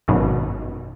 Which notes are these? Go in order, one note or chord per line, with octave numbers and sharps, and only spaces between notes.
G#1 F#2 B2 D#4